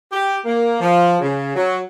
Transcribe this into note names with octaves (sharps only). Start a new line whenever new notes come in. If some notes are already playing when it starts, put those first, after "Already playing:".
G4
A#3
F3
C#3
F#3